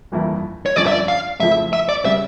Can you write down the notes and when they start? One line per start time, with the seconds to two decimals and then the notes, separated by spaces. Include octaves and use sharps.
0.12 G1 F2 E3 A#3 E4
0.66 C#5
0.76 G1 F2 D3 F3 C#4 D5
0.87 E5
0.92 D5
1.08 F5
1.40 F2 C#3 F3 A3 E4 E5
1.73 E5
1.89 D5
2.05 C#3 G3 C#4 E5